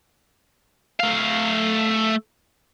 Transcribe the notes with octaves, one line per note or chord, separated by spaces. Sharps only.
A3 F5